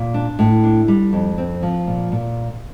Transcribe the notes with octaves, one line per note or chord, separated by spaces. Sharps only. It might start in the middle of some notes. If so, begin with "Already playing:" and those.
Already playing: A#2
D4
A2
D4
G3
F2
C4
F3
A#2
A#2